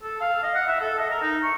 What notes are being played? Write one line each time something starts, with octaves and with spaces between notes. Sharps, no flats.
A4
F5
D#5
F#5
E5
A4
D#5
A#4
D#4
C#6